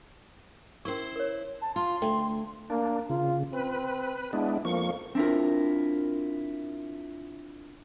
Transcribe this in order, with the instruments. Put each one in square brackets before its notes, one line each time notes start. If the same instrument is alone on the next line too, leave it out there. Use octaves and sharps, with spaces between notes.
[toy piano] C#4 A#4 C#6 [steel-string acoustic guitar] E4 C5
[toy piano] A#4 C#5
[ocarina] A5
[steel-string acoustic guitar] F4 [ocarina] C6
[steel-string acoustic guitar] D2 [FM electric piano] A3 [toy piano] G5
[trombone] A#3 [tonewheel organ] D4
[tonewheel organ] C#3 [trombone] F4
[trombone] C4 [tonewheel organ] B4
[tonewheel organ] G#3 B3 D4 [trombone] E4
[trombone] F2 [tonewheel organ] F3 A#3 C#6
[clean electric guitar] C4 D4 E4 F4 A#4